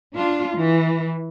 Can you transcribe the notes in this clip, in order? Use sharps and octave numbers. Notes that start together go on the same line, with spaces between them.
D4 F4
E3